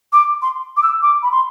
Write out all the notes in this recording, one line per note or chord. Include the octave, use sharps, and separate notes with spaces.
D6
C6
D6
E6
D6
B5
C6